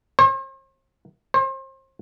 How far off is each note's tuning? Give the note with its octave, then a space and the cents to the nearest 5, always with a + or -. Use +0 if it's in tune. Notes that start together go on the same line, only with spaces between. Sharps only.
C5 +45
C5 +35